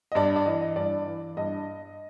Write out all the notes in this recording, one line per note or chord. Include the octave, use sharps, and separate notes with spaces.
D#5
G2 D5
D5
E3 D#5
D#5
G2 D5
E3
G2 D#5